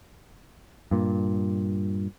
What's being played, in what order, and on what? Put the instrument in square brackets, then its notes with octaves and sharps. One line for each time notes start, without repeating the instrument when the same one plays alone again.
[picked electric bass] G2 A#2